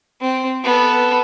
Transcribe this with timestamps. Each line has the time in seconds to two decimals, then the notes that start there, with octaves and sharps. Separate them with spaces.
0.21 C4
0.64 B3 A4